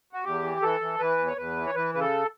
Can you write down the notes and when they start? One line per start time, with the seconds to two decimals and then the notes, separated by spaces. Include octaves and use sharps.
0.13 F#4
0.24 E2 G4
0.42 E3
0.62 E3 A4
0.81 E3
0.99 E3 B4
1.18 E2
1.28 C#5
1.37 E2 B4
1.57 E3
1.66 C#5
1.75 E3 B4
1.94 C#3 B4
2.00 A4